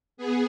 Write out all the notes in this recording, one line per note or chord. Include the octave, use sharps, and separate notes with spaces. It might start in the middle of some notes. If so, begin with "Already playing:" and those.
B3 G#4